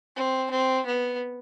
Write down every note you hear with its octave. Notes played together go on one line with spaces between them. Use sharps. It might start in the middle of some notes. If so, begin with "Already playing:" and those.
C4
C4
B3